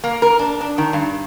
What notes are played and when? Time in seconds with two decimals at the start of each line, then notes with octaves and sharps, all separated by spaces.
0.04 A#3
0.22 A#4
0.39 D4
0.61 D4
0.78 D#3
0.93 G2